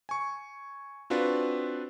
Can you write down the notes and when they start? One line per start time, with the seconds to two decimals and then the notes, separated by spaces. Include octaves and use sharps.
0.09 G#5 C#6
1.10 C4 D4 F4 F#4 B4